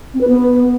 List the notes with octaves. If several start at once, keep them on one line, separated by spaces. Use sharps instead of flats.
C4
B4
B3